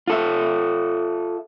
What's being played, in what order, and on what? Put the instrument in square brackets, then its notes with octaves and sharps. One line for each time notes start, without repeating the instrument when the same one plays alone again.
[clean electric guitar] F4 A4 E5